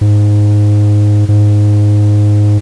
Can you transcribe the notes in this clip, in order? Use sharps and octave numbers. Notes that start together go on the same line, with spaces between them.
G#2
G#2